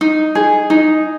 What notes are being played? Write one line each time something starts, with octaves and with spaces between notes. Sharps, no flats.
D#4
G#4
D#4